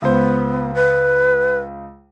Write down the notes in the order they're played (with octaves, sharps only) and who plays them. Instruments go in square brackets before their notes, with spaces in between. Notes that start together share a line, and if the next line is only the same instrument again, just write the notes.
[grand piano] C#2 C5 [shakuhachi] B3
[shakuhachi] B4